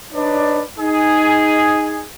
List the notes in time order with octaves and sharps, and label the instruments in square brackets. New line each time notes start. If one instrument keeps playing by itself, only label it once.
[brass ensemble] D4 D#4 B4 C#5 D5
D#4 G#4